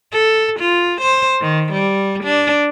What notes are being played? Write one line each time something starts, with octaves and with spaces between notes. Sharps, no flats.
A4
F4
C5
D#3
G3
D4